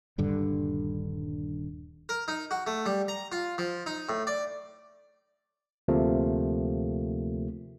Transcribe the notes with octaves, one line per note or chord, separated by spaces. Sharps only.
D#1 G2 D3
A#4
D#4
F#4
A3
G3
A#5
F4
F3
D#4
A2
D5
D2 C3 F3 A3 A#3